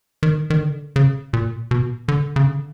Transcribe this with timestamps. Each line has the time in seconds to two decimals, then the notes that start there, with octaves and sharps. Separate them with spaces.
0.23 D#3
0.50 D#3
0.59 D3
0.96 C#3
1.33 A#2
1.71 B2
2.08 D3
2.36 C#3
2.45 D3